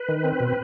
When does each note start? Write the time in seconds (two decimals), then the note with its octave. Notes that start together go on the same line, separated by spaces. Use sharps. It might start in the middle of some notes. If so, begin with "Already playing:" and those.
Already playing: B4
0.08 D#3
0.24 C4
0.40 B2